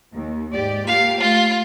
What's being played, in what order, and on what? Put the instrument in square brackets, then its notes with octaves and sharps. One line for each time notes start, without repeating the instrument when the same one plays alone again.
[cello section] D#2
G#2 G4 D5
[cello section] A#3 F4 G4 [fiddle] F5
[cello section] A3 [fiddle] F4